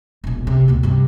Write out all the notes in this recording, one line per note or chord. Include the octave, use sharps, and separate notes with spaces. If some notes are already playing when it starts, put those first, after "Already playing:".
E1 A#1
C3
D2 B2
G2 C3